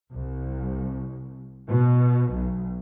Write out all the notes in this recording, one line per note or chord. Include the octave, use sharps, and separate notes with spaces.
C2
B2
B1